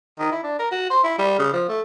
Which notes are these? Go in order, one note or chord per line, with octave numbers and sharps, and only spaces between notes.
D#3
E4
D4
A#4
F#4
C5
E4
G3
C#3
F3
A3